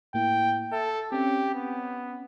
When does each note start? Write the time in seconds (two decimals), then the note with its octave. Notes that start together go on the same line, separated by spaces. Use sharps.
0.14 A2 A#3 E4 G5
0.72 A4 E5 E6
1.12 C4 C#4 G4
1.54 B3